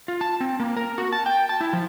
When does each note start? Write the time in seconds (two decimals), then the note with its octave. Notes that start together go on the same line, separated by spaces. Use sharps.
0.08 F4
0.21 A5
0.40 C4
0.60 A#3
0.77 A#4
0.98 F#4
1.12 A5
1.26 G5
1.49 A5
1.61 E4
1.73 F3